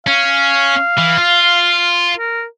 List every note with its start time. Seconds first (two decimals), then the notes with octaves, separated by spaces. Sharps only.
0.07 C#4 F5
0.98 E3
1.18 F4
2.18 A#4